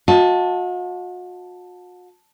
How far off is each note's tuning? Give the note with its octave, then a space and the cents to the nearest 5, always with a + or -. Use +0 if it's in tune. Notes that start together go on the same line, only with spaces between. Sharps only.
F#4 -45 D#5 +45 A5 +0